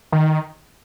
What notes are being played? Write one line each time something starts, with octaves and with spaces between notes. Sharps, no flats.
D#3